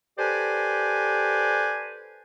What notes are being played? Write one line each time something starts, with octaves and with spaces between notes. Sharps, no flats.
G4 A4 B4 C5 D5 G#5